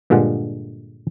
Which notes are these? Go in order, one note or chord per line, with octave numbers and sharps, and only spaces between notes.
G2 A#2 D3 G#3 F#5